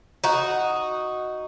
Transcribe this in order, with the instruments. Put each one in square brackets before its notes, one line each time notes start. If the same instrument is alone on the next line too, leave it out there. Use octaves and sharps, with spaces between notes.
[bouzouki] D#4 F#4